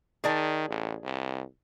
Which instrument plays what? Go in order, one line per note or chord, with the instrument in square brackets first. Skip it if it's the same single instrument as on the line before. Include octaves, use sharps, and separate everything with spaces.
[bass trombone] D#3 [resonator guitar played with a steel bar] G#4 D5 A5
[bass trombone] A1
C2